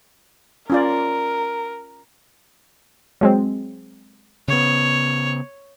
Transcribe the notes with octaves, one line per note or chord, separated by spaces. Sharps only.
C#4 F4 A#4 D5
F#3 G#3 C4
C#3 B3 C#5